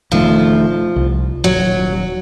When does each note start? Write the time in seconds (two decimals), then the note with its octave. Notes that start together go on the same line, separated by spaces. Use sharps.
0.12 E1 D#3 F3 A3
0.96 C2
1.44 D#1 F#3